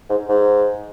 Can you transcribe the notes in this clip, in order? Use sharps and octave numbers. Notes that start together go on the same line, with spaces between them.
G#2
G#2